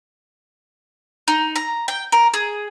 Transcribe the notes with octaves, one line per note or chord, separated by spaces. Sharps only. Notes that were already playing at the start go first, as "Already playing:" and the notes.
D#4
A#5
G5
A#4
G#4